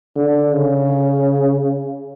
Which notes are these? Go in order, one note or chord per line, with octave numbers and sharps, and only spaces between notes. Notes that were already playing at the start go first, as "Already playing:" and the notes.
D3
C#3